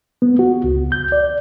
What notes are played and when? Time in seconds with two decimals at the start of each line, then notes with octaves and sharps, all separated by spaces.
0.22 B3
0.39 F#4
0.64 C#2
0.92 G6
1.12 D5